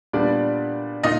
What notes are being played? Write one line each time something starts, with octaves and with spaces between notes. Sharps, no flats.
A#2 G3 B3 D4 D5
A#2 D#4 D#5